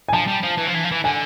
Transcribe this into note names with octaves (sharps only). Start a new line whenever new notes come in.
G#5
F3 A5
G3
F3
E3
F3
E3
F3
E3
D3 G#5